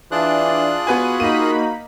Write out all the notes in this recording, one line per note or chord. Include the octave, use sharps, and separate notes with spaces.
E3 D4 F4 G#4 F#6
B3 F#4 B4 G#5
A#3 D#4 B5 D#7